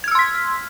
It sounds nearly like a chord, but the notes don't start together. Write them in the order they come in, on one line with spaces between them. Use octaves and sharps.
G#6 F6 E6 C6 B6